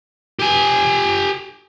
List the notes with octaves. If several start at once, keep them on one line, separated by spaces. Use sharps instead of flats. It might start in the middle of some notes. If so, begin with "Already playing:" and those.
G4 G#5